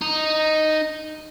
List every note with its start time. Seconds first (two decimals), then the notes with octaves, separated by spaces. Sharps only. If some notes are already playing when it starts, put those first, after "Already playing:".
0.02 D#4